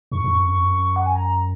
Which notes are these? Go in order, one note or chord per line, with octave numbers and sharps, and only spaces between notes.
F2 C#6
F2
F#2
F2
F#2
F2
F#2
F#5
G#5
A#5